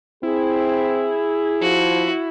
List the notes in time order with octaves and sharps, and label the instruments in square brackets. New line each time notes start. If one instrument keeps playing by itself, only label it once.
[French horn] C4 [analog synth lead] E4 [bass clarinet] G#4
[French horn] F3 [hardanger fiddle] F#4